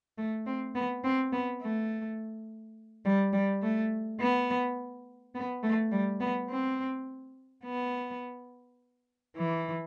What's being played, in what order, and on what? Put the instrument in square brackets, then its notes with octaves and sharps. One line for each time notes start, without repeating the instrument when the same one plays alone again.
[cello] A3
C4
B3
C4
B3
A3
G3
G3
A3
B3
B3
A3
G3
B3
C4
B3
E3